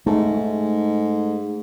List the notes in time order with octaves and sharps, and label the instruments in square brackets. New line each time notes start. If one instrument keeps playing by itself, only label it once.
[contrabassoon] G#2 [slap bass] A3